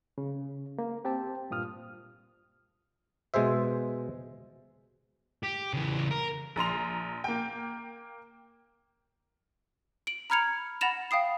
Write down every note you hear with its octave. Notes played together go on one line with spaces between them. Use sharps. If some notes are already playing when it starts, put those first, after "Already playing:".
C#3
A#3
C4 G4 C5 G5 A5
G2 A#2 F4 D#6 F6
B2 G#3 G#4 C5 E5
G4
C#3 E3
A#4
A#1 A#5 C6 F7
A#3 G5
D7 F#7
A#5 B5 F6 G#6 C#7 F7
F#5 B5 A6 A#6 E7 F7
F5 G5 D#6 C7